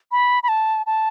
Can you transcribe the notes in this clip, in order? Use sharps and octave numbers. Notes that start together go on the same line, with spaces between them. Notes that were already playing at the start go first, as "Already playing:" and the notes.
B5
B5
A5
A5